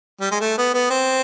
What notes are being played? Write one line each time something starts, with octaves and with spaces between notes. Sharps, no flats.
G3
G#3
A3
B3
B3
C4